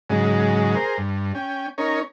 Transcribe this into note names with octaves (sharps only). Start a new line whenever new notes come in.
G#2 C#3 F#3 G#3
G#4 A#4 C5
G2
C#4 G5
C#4 D#4 A#4 C#5